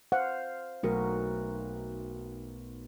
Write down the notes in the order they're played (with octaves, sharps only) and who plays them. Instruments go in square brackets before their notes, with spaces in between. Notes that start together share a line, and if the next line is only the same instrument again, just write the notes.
[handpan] C5 F5 [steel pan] F#5
[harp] B1 D#4 C#7 [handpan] A3 F#4 A#4